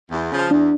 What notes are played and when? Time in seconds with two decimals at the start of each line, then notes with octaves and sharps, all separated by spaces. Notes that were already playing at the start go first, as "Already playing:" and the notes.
0.10 E2
0.30 C#3 F3
0.51 E2 D4